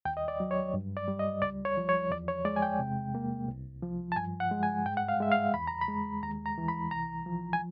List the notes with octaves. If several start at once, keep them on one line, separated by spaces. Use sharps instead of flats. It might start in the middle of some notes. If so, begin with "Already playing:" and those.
D#2 G5
D#5
D5
F#3
C#5
G2
D5
G3
D#5
C#2 D5
C#5
F3
C#5
E2 D5
C#5
G#3 D5
G#5
G5
C3
A#3
C2
F3
A5
G2 G#5
F#5
G#3
G#5
G#2 G5
F#5
F5
G#3 E5
F5
E2 B5
A#5
B5
G#3
D#2 A#5
A#5
E3
B5
C2 A#5
F3
G#5